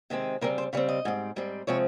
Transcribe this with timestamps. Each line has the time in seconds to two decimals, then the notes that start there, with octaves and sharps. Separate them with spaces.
0.10 C3 D#3 G#3 C4
0.41 C#3 G3 C4 A#4
0.58 C5
0.73 C#3 G3 C4 C#5
0.89 D#5
1.05 G#2 G3 C4
1.36 G#2 G3 C4
1.67 C3 F3 G#3 C4 C#5